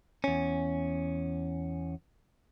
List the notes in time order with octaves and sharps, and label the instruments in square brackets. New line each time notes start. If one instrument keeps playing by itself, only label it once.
[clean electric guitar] E2 C#4